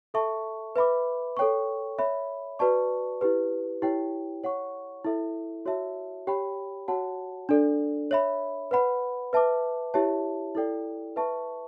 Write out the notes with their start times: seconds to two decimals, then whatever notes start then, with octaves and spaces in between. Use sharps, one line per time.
0.14 A4 E5 A5 C#6
0.76 B4 E5 B5 D6
1.37 A4 C#5 G5 C#6
1.98 C#5 E5 B5
2.59 F#4 B4 D5 A5 C#6
3.21 E4 G4 B4
3.82 E4 G4 C#5 G5
4.44 C#5 F#5 C#6
5.04 E4 A4 E5
5.66 F#4 C#5 E5 A5
6.27 G4 C#5 G5 B5
6.88 F#4 C#5 F#5 A5
7.49 D4 A4 D5
8.11 C#5 E5 B5
8.71 B4 F#5 B5
9.33 B4 E5 A5 D6
9.94 E4 G4 C#5 E5 A5
10.55 E4 A4 D5 G5
11.16 B4 E5 A5 C#6